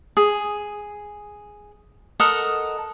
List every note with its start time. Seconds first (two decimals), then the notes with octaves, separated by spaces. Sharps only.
0.17 G#4
2.20 A4 A#4 D#5 F#5